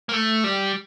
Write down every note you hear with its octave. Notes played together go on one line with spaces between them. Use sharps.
A#3
A3
G3